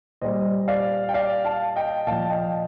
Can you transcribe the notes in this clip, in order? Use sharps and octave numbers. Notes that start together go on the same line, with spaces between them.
A#2 G3 C5 D#5
D5 F5
G5
D5 F5
F5 A5
D#5 G5
A#2 F3 F5 A5
D#5 G5